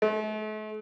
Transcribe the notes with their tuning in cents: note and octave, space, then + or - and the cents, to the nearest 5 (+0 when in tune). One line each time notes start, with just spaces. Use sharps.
A3 -40